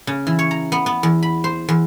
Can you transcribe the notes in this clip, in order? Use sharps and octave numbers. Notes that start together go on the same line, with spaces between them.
C#3
E3
C#5
A#5
B3
B3
E2
B5
C5
E2